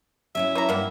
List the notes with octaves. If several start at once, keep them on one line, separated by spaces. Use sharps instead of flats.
F#3 C#4 E4 E5
E3 A#5
G2 A#3 B3 E4